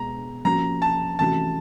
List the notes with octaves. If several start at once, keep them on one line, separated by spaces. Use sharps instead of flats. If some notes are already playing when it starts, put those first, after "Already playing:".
Already playing: B2 G#3 B3 A#5
F3 A#3 C#4 F#4 A#5
A5
C3 E3 A3 C#4 F#4 A5